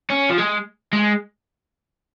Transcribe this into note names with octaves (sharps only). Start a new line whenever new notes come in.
C#4
F3
G#3
G#3